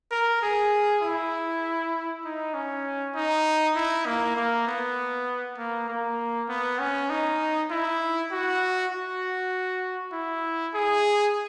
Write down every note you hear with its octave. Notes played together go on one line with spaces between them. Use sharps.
A#4
G#4
E4
D#4
C#4
D#4
E4
A#3
A#3
B3
A#3
A#3
B3
C#4
D#4
E4
F#4
F#4
E4
G#4